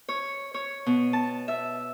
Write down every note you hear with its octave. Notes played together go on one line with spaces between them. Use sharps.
C#5
C#5
B2
A5
E5